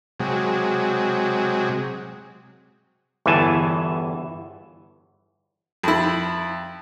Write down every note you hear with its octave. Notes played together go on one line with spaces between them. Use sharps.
C3 F#3 G#3
G1 E2 E3 E5 G#5 A5
F2 E4